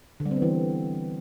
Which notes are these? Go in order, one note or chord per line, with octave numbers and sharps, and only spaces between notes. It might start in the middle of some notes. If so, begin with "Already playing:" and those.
D3
G3
C4
B3
E3